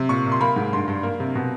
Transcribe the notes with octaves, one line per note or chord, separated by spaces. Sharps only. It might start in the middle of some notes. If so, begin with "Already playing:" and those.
Already playing: C3
A#2 C#6
A#2
C6
A#3 B5
G#2
G2 C6
G2
A#3
C3
B2